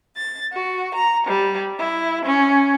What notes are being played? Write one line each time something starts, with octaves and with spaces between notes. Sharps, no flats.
A6
F#4
A#5
G3
E4
C#4